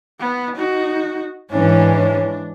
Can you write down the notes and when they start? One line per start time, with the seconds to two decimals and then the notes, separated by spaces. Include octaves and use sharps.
0.19 B3
0.56 D#4 F#4
1.51 G#2 E3 C#4 D4